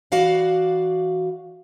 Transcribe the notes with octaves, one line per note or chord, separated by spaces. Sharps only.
E3 F#4 D5 F5 F#5